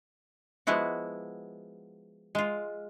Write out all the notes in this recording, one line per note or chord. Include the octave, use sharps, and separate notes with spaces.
F3 G#3 B3 E4 F#4
G#3 F4